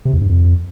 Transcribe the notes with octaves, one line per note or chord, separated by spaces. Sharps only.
C3
E2
G2
F2